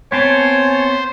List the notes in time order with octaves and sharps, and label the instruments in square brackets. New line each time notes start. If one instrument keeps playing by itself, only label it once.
[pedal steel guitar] B3 C4 A5 [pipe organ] C5 [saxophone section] C#5 [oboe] G#5